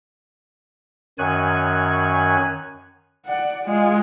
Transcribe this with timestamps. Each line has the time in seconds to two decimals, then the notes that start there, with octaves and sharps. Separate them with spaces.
1.18 F#2 D#3 C#5 G#5 F#6
3.25 D5 F#5
3.64 G#3 F4